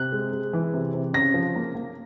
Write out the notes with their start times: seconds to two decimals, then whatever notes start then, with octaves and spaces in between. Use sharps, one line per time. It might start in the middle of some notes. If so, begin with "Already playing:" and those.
Already playing: C3 F#6
0.12 G#3
0.32 G#3
0.53 E3
0.74 C3
0.94 C3
1.14 C#3 A#6
1.34 F3
1.56 A#3
1.75 A#3